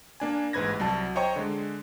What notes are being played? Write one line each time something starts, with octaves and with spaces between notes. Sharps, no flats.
A#3 D4 G#5
A1 G#2 B4 B5 G#6 A#6
C2 F#3 A5
C5 C#5 D#5 G5 A#5 C#6
D3 G#3